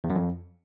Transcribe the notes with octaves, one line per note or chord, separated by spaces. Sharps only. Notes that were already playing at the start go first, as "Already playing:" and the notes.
E2
F#2
F2